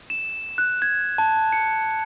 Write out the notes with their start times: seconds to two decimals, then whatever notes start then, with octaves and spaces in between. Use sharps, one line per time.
0.10 E7
0.58 F#6
0.82 G#6
1.18 A5
1.52 C#7